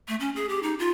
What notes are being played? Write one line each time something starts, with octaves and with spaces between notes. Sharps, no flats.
A3
C#4
G#4
G4
D#4
F4